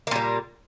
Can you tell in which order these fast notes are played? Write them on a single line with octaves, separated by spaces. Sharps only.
A#3 A#2 G3